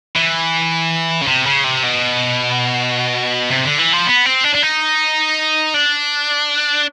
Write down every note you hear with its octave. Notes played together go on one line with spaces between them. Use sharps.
E3
C#3
C3
C#3
C3
B2
C3
D3
E3
F3
B3
C4
D4
D4
D#4
D4